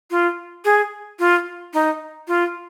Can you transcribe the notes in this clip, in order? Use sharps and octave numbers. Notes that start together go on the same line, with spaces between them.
F4
G#4
F4
D#4
F4